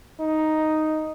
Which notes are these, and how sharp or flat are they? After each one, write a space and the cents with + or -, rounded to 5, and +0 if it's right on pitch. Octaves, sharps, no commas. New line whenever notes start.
D#4 +0